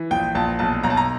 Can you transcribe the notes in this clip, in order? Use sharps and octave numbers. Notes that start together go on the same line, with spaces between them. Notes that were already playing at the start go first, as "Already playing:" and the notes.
Already playing: E3
A#1 G5
A#1 A5
B1 A5
B1 A#5
A5
A#5